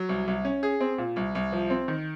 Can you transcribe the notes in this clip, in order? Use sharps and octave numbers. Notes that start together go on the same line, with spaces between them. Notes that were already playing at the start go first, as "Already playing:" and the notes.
Already playing: F#3
C2
C2
C#4
G#4
C4
A#2
C2
C2
F3
C4
D#3